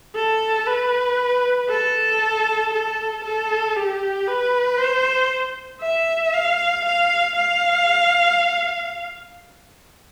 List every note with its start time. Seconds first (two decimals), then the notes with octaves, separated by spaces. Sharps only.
0.16 A4
0.67 B4
1.70 A4
2.74 A4
3.24 A4
3.76 G4
4.27 B4
4.78 C5
5.82 E5
6.33 F5
6.85 F5
7.36 F5